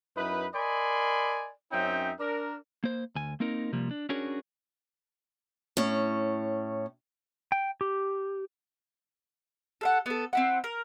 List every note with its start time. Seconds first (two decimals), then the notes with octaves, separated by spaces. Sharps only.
0.17 F#2 D#4 E4 B4
0.54 A#4 D5 D#5 G#5 B5 C6
1.72 F#2 C4 C#4 D#4 E5 G5
2.20 D4 A#4
2.84 A#3 C5
3.15 D2 G#5
3.40 A#3 C4 D#4 A#4
3.72 C3 F3 G3 A#3
3.91 D4
4.09 C#4 D4 F#4 G#4 A#4 C#5
5.77 A2 C#4
7.52 G5
7.81 G4
9.81 A4 F5 F#5
10.06 B3 A4
10.33 C4 E4 F#5
10.64 A#4